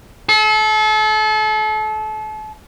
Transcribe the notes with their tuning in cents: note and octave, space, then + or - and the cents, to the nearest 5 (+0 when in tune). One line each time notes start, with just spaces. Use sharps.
A4 -35